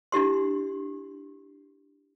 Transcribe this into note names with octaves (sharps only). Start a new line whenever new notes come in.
D4 E4 G4 C6